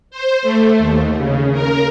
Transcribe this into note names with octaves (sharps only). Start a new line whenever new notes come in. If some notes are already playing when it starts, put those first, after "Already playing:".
C5
A3
D#2
C#3
A#4